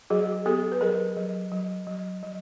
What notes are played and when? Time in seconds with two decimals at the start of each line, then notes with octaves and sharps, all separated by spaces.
0.10 F#3 F#4 G#4
0.46 B3 G4 A4
0.72 B4
0.81 F#3 G#4 A#4
1.17 F#3
1.52 F#3
1.87 F#3
2.22 F#3